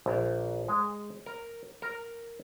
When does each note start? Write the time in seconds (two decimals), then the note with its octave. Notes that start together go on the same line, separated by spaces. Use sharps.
0.06 A#1
0.68 G#3
1.26 A#4
1.82 A#4